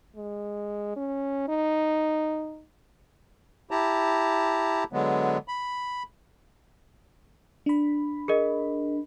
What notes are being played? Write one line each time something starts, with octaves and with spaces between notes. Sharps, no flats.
G#3
C#4
D#4
E4 G4 A5 A#5
D3 F#3 G#3 B3
B5
D4 B5
G#4 A#4 D#5